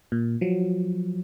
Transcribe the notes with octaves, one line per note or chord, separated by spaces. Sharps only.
A#2
F3 F#3